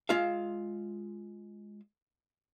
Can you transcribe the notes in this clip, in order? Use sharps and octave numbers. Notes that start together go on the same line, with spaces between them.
G#3 F4 E5 F5